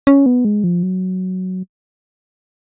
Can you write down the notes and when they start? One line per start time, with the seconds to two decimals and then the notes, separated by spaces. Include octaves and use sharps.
0.07 C#4
0.26 B3
0.45 G#3
0.64 F3
0.83 F#3